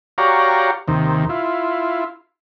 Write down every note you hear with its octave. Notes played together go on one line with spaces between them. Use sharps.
F#4 G4 C#5 D5 F5 A#5
D#2 C3 D#3
E4 F4